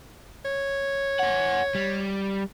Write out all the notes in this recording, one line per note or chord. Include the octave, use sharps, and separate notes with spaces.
C#5
G#4 F#5
G3